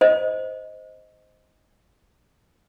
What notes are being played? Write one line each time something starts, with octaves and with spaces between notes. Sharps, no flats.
C5 D#5